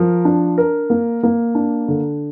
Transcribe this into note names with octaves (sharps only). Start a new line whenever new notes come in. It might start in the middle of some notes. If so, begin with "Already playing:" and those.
Already playing: F3 A#4
D4
A#4
A#3
A#3
D4
D3